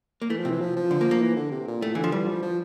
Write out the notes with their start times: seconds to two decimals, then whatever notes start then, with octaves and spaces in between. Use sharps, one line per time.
0.22 A#3
0.29 E3 A3
0.40 F3
0.45 C3
0.51 E3
0.61 F3
0.76 F3
0.91 D3
1.01 A#3
1.11 A#3
1.21 E3
1.36 D3
1.51 C3
1.67 A#2
1.82 A2 A3
1.95 D3 E3
2.04 F3
2.12 E3 G3
2.28 F3
2.42 F3